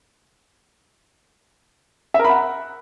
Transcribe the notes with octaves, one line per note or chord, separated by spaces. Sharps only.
E5
A#4
B5
F#5